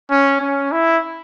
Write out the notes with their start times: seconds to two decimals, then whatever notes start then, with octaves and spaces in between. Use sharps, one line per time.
0.11 C#4
0.41 C#4
0.72 E4